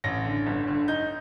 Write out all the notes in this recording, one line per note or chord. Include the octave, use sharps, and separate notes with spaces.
A1 A#6
D3
G1
D3
D#4 G6